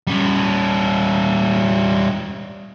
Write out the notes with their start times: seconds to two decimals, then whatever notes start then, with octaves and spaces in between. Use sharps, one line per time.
0.07 G3 C#4